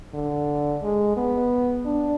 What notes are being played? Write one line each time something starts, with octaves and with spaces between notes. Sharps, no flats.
D3
G#3
B3
D4